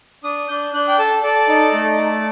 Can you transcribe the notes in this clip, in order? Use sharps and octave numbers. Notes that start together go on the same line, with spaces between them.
D4 D#6
D4 G6
D4 F#6
G5
A4 A5
A4 D5
D#4
A3
A4